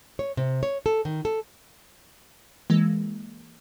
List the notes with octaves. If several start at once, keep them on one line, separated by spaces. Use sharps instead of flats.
C#5
C3
C#5
A4
D#3
A4
E3 G#3 A#3